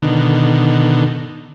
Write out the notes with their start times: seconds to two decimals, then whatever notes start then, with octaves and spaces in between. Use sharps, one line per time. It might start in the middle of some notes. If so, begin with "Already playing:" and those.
0.02 B2 D3 D#3